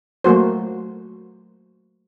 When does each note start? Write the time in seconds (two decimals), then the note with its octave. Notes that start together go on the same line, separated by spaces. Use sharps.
0.24 F#3 A3 A#3 F#4 C5